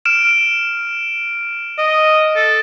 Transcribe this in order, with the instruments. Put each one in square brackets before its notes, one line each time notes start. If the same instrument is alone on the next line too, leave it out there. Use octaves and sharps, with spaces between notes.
[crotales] F6 D7 E7
[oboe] D#5
A4